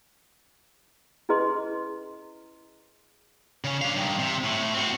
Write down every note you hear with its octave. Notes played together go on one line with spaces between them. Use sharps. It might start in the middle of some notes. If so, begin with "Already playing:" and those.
C#4 E4 G#4 B4 D#5 C6
C#3 C#4
D4 F5
G2 D#3
C3
A2
C4 F#4